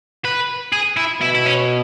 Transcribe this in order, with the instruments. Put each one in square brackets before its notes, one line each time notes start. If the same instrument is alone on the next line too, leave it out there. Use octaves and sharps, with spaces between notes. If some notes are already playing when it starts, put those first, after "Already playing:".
[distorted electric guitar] B4
G#4
E4
[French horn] B2 [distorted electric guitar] E4
[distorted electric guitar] E4
C#4